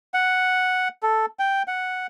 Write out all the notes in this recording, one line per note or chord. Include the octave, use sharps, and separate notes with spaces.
F#5
A4
G5
F#5